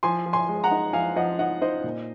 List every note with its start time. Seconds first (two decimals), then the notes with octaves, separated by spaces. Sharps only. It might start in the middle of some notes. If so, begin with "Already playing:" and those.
0.03 F3 G#5 C6
0.26 F3
0.33 G#5 C6
0.49 G#3
0.64 F#5 A#5
0.71 D#4
0.93 F3 F5 G#5
1.16 F3 D#5 F#5
1.39 D#4 D#5 F#5
1.62 D#4 C5 D#5
1.84 A#2